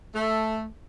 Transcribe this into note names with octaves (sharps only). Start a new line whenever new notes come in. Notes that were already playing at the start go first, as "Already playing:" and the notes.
A3